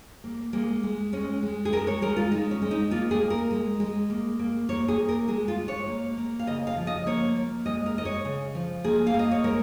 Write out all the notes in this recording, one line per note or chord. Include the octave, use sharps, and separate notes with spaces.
A#3
G#3 A#3
G#3
G#3 C#4
G#3
G#4
G#3 A#4
C#5
G#3 A#4
F4
G#3 D#4
C#4
G#3
D#4
A#3 F4
G#4
A#3
A#4
G#3
G#3
A#3
A#3
A#3 C#5
G#4
A#3
A#4
G#3 G#4
F4
G#3
C#5
A#3
A#3
F5
C#3 D#5
F5
F3
D#5
A#3 C#5
A#3
G#3 D#5
A#4
G#3 D#5
C#5
C#3
F3
A#3 G#4
F5
A#3
D#5
C#5
G#3 A#4